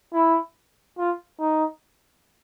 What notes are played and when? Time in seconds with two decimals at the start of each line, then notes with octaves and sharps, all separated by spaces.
0.13 E4
0.98 F4
1.39 D#4